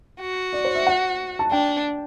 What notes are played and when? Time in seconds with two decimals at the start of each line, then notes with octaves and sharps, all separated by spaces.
0.21 F#4
0.53 D5
0.65 C5
0.75 E5
0.87 F#5
1.39 A5
1.51 D4 G5